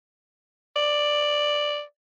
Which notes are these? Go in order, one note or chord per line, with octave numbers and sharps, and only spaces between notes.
D5